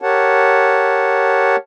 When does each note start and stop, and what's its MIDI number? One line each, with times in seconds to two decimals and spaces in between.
0.02 1.56 67
0.02 1.56 70
0.02 1.56 73
0.02 1.56 78
0.02 1.56 81